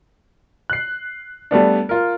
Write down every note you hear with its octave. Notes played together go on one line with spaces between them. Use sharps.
F#6 C7
G3 A3 B3 D4
F4 A#4